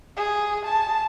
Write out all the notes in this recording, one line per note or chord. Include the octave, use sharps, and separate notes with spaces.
G#4
A5